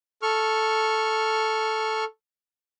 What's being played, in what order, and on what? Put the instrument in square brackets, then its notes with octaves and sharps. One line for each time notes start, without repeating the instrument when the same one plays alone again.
[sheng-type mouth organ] A4 C#6 F6